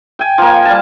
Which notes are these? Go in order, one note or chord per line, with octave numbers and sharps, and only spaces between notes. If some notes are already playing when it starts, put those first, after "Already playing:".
G5 G#5
F3 A#3
G3 A5